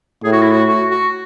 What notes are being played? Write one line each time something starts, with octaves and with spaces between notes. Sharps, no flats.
A2 G#4
F#4
E4
F#4
F#4
F#4